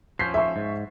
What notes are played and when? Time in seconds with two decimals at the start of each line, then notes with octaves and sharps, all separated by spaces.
0.19 F3 C#4 G6 B6 C7
0.34 E5 C#6
0.56 G#2